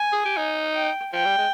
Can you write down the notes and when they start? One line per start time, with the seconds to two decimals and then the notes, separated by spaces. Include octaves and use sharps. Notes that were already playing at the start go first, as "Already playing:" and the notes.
Already playing: G#5
0.12 G#4
0.25 G4
0.37 D#4
0.75 G5
1.12 F3 G5
1.25 G3
1.38 G#3